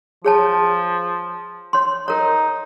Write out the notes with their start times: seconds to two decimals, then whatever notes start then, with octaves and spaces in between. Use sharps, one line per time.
0.24 F3 G#4 C#5 A5
1.73 C#5 C6
2.08 D#4 A#4 C#5